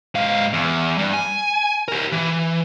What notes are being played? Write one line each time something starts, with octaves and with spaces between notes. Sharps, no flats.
G#2 F5
E2
G2
G#5
G4 A#4
E3